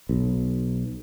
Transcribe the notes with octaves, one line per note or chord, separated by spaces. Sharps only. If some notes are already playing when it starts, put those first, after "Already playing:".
B1